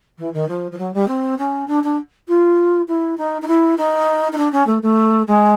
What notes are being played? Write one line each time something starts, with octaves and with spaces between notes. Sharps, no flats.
E3
D#3
F3
F3
F#3
G3
C4
C#4
D4
D4
F4
E4
D#4
D#4
E4
D#4
D#4
D4
C#4
A3
A3
G#3